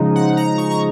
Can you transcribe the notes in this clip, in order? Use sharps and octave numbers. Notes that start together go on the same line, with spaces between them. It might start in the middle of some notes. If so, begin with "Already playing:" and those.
Already playing: C#3 F3 G#3 D#4
F#5
A#5
C#6
A#5